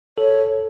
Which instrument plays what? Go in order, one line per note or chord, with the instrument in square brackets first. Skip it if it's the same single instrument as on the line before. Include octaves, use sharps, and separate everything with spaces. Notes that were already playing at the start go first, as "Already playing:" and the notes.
[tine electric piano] A4 [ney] C#5